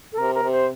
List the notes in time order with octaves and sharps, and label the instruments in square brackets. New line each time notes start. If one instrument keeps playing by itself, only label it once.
[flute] A4
[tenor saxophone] C3 [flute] A#4
[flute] A#4
[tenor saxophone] C3
[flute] C5